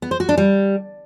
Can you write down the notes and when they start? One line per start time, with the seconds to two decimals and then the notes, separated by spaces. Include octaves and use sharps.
0.02 B3
0.11 C5
0.20 F#4
0.29 D4
0.37 G3